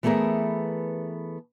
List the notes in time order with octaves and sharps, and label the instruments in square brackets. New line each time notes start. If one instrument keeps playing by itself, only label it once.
[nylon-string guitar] E3 A3 B3 G#4 A#4 E5